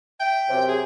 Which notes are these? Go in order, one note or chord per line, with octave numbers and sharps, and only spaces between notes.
E5 G5
F#2 C3
G#4